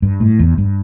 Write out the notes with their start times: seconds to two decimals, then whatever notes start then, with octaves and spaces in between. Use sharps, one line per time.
0.02 G2
0.20 A2
0.39 E2
0.58 G2